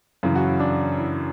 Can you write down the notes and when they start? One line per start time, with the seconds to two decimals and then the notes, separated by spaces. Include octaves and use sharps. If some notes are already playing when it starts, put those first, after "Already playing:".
0.23 F#2 C#3 E3 E4
0.36 F#4
0.47 E4
0.59 D4
0.97 E4